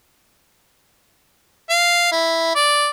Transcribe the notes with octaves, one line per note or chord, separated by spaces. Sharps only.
F5
E4
D5